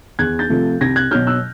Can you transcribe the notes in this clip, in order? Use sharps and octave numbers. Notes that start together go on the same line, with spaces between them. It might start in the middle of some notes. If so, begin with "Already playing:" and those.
E2 F#6 G#6
G6 A6
C3 F3 A3
C2 G#6 A#6
F#6 G#6
B2 F#3 F6 G6
E6 F#6